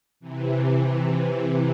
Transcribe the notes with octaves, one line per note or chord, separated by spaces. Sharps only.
C3 E3